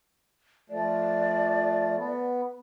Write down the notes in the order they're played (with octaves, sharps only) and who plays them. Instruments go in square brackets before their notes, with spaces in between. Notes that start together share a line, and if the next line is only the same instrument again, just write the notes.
[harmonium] F3 A3 [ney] D5
[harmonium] B3